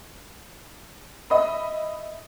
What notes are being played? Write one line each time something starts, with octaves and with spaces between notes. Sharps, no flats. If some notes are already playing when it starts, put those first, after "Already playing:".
D#5 E5 B5